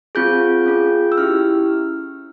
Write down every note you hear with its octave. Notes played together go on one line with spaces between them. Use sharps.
C4 F4 G#4 G6
C#4 F4 G#4
E6
C#4 E4 G4 F6